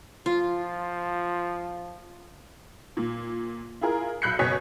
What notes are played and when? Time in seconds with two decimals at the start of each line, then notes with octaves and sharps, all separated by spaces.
0.26 F3 F4
2.97 A#2
3.81 E4 F4 G#4 A#4
4.22 B1 B5 F#6 G6 C7 C#7
4.39 F#1 B2 C#5 G#5 B6